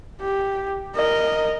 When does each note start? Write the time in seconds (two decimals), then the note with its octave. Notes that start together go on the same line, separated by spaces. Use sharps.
0.21 G4
0.96 A#4 D#5